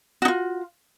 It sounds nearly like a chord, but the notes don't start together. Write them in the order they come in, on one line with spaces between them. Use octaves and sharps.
F#4 D#4 F4